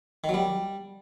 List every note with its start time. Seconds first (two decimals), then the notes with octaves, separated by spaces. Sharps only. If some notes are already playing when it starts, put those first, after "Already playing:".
0.24 D#3
0.29 F#3
0.34 G3